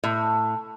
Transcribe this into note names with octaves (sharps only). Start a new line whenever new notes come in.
A2